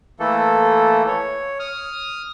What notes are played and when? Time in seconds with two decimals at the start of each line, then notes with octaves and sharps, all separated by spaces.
0.20 E3 A3 A#3 A4
1.07 C#5
1.59 D#6 F6